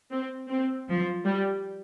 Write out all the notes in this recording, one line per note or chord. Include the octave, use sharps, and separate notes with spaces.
C4
C4
F3
G3